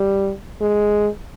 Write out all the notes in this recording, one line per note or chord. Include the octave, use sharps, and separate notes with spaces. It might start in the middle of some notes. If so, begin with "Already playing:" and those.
Already playing: G3
G#3